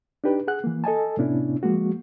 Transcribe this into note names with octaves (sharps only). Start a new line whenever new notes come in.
D4 D#4 G4 B4
G#4 F#5 F#6
E3 A#3
A4 D#5 G#5 A5
A2 C3 B3 C#4 D4 E4
F3 G#3 A#3 F#4